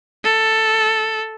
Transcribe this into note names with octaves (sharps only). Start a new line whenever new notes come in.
A4